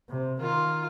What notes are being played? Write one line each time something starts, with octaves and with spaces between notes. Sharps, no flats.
C3
D#3 F4